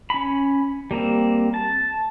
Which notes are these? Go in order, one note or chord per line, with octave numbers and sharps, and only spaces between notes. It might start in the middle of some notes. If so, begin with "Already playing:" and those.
C#4 B5
G3 A#3 C4
A5